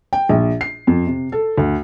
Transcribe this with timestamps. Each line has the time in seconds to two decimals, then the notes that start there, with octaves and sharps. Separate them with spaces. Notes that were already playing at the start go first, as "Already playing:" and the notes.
0.13 G5
0.29 A#1
0.61 C7
0.87 F2
1.07 C3
1.32 A4
1.58 D2